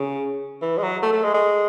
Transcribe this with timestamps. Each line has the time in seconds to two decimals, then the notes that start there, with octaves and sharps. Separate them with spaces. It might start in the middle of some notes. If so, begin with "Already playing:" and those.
Already playing: C#3
0.62 E3
0.78 G#3
0.83 F#3
1.03 A3
1.13 A3
1.23 G#3
1.34 G#3